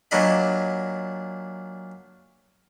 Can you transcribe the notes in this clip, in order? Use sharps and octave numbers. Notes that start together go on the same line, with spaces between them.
A#2 F#3 D4 D#5 B5